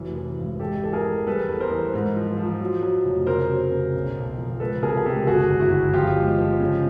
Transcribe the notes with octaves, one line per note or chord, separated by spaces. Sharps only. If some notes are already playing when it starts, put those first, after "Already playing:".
Already playing: F1 E3 F#3
E3
G#1
G#3 G4 A4
E3 A4
G#4 A#4
E3
G3 A4 B4
E2
A#4 C5
E3
G#2
F3
F3
F#3
F#3
F1
C#3 A#4 C5
F#3
C#3
B1
B1
F3
C#2 A4 B4
C3 G#4 A#4
G#4
C#2 G4 A4
G1 F#4 G#4
F#2
E4 F#4
G1
F3 F4 G4
G#3
F3
C#3